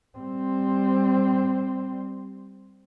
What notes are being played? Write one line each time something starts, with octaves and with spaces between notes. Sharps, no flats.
G3 C4